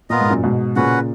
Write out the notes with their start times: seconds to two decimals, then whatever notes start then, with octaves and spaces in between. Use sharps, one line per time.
0.10 A#2 B3 F4 A#4 D#5
0.20 G#2
0.30 F#2 A#2
0.43 G#2 B2
0.76 A#2 C#3 C#4 F#4 B4 F#5